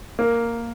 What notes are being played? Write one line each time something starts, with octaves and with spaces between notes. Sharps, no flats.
A#3